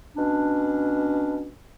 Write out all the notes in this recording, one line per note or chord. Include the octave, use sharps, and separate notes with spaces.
B2 C#4 D4